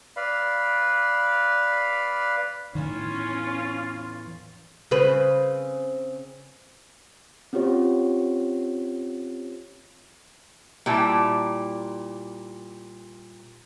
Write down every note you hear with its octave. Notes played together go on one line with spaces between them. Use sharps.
B4 D5 F5 B5
E2 A2 D#3 E3 C#4 F4
C#3 C4 B4
C4 C#4 F4 G4 C5 C#5
A#2 G3 E4 G5 A5